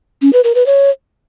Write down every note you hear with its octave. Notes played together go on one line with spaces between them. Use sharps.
C#4
B4
A#4
B4
C#5